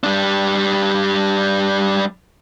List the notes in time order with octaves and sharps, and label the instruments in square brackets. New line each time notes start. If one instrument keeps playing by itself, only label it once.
[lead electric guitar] G3 D4